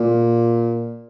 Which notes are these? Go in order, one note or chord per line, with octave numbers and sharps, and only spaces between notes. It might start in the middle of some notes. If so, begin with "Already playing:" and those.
Already playing: A#2